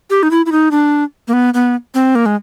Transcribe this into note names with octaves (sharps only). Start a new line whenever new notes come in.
G4
D#4
E4
E4
D#4
D4
A#3
B3
B3
C4
A#3
G#3